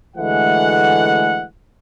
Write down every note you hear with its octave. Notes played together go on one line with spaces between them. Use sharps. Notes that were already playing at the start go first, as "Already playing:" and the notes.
D2 E3 G#3 A3 F#5